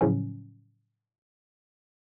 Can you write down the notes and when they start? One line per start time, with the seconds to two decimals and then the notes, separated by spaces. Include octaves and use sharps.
0.01 A2 C#3 F3 F#3 C#4